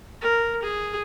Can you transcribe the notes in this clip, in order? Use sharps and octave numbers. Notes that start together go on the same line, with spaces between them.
A#4
G#4